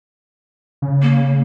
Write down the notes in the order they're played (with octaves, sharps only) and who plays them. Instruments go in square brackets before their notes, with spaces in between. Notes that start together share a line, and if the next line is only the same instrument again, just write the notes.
[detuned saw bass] C#3
[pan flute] A#3